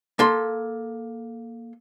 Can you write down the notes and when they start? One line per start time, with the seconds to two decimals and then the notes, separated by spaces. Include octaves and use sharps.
0.19 A#3 A4 C6